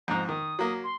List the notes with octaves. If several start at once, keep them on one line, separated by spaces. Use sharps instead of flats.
F2 G#2 A#5
D#3 D#6
F#3 A#3
C6